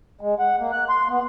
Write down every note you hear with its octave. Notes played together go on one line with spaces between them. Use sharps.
G#3
F#5
A#3
F#6
C6
B3